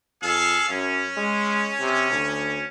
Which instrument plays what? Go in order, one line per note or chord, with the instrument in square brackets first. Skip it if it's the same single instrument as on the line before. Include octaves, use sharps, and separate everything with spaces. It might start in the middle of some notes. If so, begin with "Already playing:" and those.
[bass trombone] F2 [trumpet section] G#4 A4 F5
[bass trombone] F#2 [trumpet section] C#4
[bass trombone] G#3
C3
D2